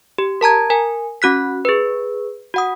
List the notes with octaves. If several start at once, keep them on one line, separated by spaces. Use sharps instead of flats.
G4
A#4 A5 A#5 G#6
A#4 G#5
C#4 F#4 F#6 B6
G#4 B4
F#4 F#5 D#6